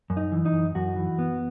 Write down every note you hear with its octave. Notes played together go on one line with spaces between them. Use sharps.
F#2
D#4
E3
D#4
F#2
F#2 F#4
E3
B3